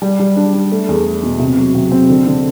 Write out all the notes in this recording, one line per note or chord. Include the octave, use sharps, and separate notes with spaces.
G3
G3
D4
D4
A3
E2
A3
B2
C3
F#3
C3
C4
D3
D3